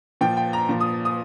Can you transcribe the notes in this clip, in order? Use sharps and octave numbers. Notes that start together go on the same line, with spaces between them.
A#2 F3 G5
G5
A#5
A#2 F3
D#6
D#6